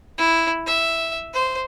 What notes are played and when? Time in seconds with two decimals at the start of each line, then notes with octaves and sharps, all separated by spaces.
0.18 E4
0.67 E5
1.34 C5